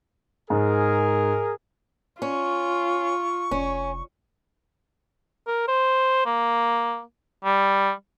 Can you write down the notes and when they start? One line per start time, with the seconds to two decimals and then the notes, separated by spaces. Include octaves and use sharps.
0.50 G#2 G#4 A#4
2.22 C#4 F4 C#6
3.51 F1 C#4
5.47 A#4
5.68 C5
6.26 A#3
7.45 G3